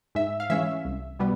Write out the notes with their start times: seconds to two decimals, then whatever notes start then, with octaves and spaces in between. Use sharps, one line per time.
0.15 G#2 E5
0.40 F5
0.50 E3 G#3 C#4 E5
0.85 C2
1.19 B2 G3 B3